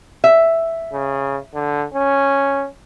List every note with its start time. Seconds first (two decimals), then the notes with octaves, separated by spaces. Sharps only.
0.24 E5
0.93 C#3
1.54 D3
1.94 C#4